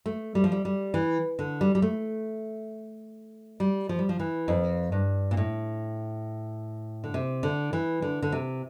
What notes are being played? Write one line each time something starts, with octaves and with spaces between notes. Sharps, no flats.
A3
G3
F3
G3
G3
E3
D3
G3
G3
A3
G3
F3
G3
F3
E3
F2
G2
A#2
A2
D3
C3
D3
E3
D3
D3
C3